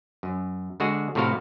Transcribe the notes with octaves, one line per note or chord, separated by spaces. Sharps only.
F#2
D3 G#3 F#4 G#4
A2 C3 F3 F#4 A#4 F5